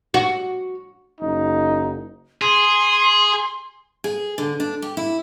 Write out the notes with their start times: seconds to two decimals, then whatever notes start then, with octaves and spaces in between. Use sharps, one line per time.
0.14 F#4
1.21 F#1 D#4
2.42 G#4 C6
4.04 G#4
4.38 D3
4.60 D4
4.82 G4
4.97 E4